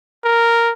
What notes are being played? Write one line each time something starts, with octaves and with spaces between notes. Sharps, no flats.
A#4